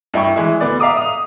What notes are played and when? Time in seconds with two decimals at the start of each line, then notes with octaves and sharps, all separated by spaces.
0.14 G2 E4 G5 C#6
0.36 E3 G#3 E4
0.61 D2 B3 D5
0.80 E5 F5 A#5 D6 D#6
0.97 D#6 F7